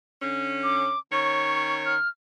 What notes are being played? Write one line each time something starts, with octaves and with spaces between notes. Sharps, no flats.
D3 C#4
D6
D#3 C#4 C#5 C#6
F6